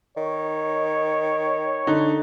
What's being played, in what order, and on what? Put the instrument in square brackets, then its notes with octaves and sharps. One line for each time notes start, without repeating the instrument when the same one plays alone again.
[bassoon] D#3 [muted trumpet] C#5
[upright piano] D3 D#4